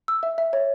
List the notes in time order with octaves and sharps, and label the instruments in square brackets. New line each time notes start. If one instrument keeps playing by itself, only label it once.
[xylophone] E6
E5
E5
C#5